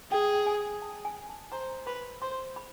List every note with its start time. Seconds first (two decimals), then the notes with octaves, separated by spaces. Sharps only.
0.11 G#4 G5
0.47 G#5
0.82 A5
1.05 G#5
1.29 A5
1.52 C5 A#5
1.87 B4 B5
2.22 C5 C6
2.56 B5